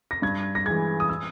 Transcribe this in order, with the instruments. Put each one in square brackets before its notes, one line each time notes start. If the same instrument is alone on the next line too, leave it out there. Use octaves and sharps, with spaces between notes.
[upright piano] A#6
G2 G#6
A#6
E3 G#3 G#6
D#6
E6